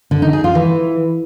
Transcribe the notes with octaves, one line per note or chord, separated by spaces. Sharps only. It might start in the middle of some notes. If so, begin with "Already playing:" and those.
D3
D#4
G#4
F4
E3